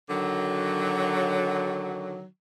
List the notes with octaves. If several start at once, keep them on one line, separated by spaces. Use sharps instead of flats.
D3 D#3 F#3